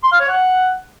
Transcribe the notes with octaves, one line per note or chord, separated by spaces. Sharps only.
C6
F5
C#5
F#5